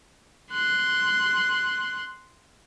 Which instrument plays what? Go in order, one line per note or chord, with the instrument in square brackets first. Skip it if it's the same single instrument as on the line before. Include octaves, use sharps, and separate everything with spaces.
[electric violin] C6 F#6